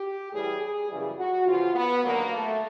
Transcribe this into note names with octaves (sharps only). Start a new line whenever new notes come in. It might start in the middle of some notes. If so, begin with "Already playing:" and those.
Already playing: G4
A2 E3 G3 G#4
G#4
F#2 C#3 E3 G3
F#4
E2 C#3 F3 F4
B3
D#2 D3 F#3 A#3
A3